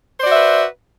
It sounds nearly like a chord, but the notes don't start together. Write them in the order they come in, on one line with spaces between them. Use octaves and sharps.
C5 D5 F#4 E5 B4